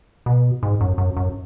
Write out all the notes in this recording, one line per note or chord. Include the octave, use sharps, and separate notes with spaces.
B2
G#2
F#2
F#2
F#2